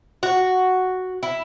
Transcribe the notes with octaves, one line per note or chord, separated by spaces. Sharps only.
F#4
E4